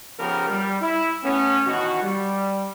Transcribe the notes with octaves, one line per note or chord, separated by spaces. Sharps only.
C#3 F3 B3 G4 A#4
G3
E4
A3 B3 C#4
B2 D#3 E3 F#4
G3